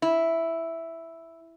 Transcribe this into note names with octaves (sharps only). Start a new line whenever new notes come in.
E4